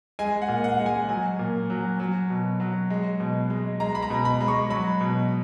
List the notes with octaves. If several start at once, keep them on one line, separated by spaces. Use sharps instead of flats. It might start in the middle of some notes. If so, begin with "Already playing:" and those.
G#3 G#5
F#5
A#2
F#5
G#3
G#5
F#3 G#5
A#2
F#3
F#3
B2
F#3
G#3
B2
G#3
G#3 A#5
B5
A#5
B2
B5
G#3
C#6
F#3 B5
B2